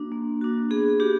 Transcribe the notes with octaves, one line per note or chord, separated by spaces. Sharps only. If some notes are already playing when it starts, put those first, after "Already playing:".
Already playing: A#3 D4 F#4
A#3
D4 F#4
B3 G#4
D4 F#4 G4